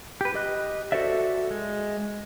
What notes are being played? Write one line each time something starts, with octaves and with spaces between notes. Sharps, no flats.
G4 B4
G4 D#5 F#6
F#4 A4 C5 D5 E5
G#3